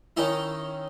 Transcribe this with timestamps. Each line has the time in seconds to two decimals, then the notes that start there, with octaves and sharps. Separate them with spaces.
0.17 D#3 C#4 D#4 E4